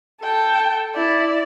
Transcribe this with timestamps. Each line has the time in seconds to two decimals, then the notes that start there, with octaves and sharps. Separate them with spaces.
0.22 A4 G5
0.95 E4 D5